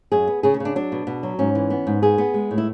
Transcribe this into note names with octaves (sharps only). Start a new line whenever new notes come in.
F#2 G#4
B3
C#3 G#4
C#4
C#3 D4
F#3 D4
B2
B2
F#3
G#2 C#4
E3
B3
G#2
B3 G#4
B3
G#3
A2
E4